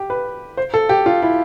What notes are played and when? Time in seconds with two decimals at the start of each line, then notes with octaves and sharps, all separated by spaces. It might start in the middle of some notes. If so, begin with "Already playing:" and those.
Already playing: G4
0.10 B4
0.57 C5
0.74 A4
0.89 G4
1.06 F4
1.22 E4